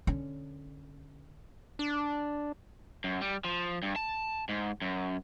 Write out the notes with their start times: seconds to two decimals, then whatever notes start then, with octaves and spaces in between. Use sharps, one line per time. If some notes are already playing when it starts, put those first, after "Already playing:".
0.07 D3 C#4
1.79 D4
3.04 F#2
3.21 G3
3.44 F3
3.83 G2
3.96 A5
4.49 G#2
4.82 F#2